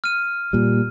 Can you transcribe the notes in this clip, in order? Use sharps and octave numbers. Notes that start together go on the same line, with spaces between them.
F6 D#7
A#2 G3